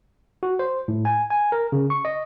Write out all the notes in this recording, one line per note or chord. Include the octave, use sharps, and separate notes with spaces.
F#4
C5
A2
G#5
G#5
A#4
C#3
C#6
D#5